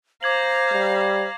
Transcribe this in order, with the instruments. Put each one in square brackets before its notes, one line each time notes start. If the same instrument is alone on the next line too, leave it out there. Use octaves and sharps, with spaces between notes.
[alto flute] C5 [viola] F5 A#5 [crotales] D6 G#6 F#7
[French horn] G3